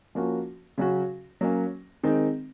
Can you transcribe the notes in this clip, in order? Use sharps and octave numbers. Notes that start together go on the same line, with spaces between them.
F3 A#3 C#4 F#4
C#3 F#3 C#4 F#4
F#3 A#3 C#4
D#3 G#3 C4 D#4